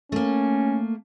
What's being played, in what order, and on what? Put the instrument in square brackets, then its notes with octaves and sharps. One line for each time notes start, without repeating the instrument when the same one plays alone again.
[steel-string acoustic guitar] A3 A#3 [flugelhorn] C#4